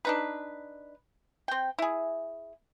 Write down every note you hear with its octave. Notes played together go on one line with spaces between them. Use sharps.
D4 D#4 B4
C4 G5
E4 G#4